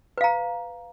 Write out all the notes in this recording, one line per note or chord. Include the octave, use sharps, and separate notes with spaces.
B4 F5 A#5